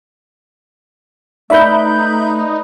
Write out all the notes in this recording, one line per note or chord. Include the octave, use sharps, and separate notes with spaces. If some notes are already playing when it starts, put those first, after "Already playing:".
A3 D#4 B4 D5 E5 B5 G6